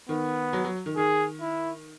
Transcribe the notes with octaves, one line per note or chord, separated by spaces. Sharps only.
D#3 B3
F#3
F#3
D#3
D#3 G#4
E4